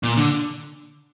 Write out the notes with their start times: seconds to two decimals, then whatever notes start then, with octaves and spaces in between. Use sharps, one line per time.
0.03 A#2
0.17 D3